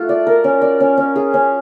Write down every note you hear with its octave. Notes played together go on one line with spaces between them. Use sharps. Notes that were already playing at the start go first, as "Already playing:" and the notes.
Already playing: A3 F4 F#4
D5
A#4
C#4
D5
C#4
C#4
G#4
C#4